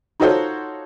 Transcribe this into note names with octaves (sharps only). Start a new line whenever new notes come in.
D#4 F4 F#4 A4 C5 C#5